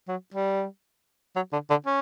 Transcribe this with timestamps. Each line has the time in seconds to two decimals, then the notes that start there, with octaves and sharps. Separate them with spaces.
0.08 F#3
0.34 G3
1.36 F#3
1.52 D3
1.70 D3
1.86 C#4